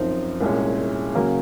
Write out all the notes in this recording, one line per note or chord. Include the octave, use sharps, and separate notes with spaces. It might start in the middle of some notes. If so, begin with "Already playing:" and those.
Already playing: F#2 F3 C4 D#4
C2 A#2 G#3 C#4
C#3 F#3 A#3 C#4